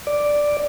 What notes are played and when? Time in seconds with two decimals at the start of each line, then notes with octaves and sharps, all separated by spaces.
0.07 D5